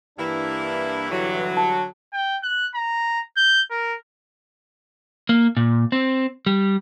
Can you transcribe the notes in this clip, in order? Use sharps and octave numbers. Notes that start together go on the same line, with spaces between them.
G2 E3 A#3 D4 E4
D3 F#3
A5
G5
F#6
A#5
G6
A#4
A#3
A#2
C4
G3